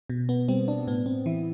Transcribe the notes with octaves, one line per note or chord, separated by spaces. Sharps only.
B2
B3
G3 C4
D4
A2 B3
C4
E3 E4